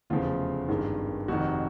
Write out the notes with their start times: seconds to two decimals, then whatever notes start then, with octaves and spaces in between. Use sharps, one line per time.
0.10 F1 E2 C#3 F3 A3 F4
0.68 G#1 G2 D#3 G#3
1.28 F1 F2 C3 D#3 F#4